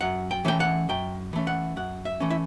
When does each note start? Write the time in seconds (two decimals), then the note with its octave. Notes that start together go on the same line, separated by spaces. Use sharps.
0.01 F#2 F#5
0.31 G5
0.45 E3 A3 C#4 G5
0.60 F#5
0.89 F#2 G5
1.33 E3 A3 C#4
1.47 F#5
1.76 F#2 F#5
2.05 E5
2.20 E3 A3 C#4
2.30 E4